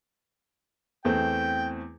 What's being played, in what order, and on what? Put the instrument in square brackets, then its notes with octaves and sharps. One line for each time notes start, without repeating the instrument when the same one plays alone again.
[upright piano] E2 A3 C4 [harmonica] G5